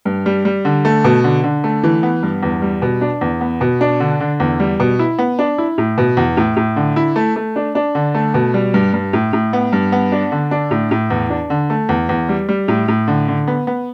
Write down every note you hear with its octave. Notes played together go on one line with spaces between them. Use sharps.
G2
G3
G3
D3
A3
B2
D3
D3
A3
E3
B3
G2
E2
G3
B2
D4
E2
B3
B2
D4
D3
D3
E2
G3
B2
E4
B3
D4
E4
A2
B2
E2
A2
A2
D3
E4
A3
A3
D4
D4
D3
A3
B2
G3
G2
G2
A2
A2
B3
G2
B3
D4
D3
D4
A2
A2
E2
D4
D3
A3
E2
E2
G3
G3
A2
A2
D3
D3
B3
B3